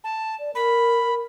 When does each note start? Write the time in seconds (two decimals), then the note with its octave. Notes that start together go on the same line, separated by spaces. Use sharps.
0.04 A5
0.39 D5
0.55 A#4 B5